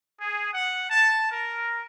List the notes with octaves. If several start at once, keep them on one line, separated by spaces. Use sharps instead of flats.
G#4
F#5
A5
A#4